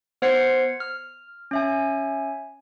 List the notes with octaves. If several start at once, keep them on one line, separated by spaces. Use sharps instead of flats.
B3 C5 F#5 G#6 C7 C#7
F6
C#4 E5 G#5